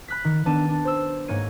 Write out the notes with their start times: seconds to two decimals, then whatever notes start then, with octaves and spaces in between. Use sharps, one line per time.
0.08 B5 F#6 B6
0.25 D#3
0.45 D#3 B3 D4 A5 D#7
0.69 D4
0.85 C5 E6
1.28 G#2 A#3 C#5 G#6 C#7 D#7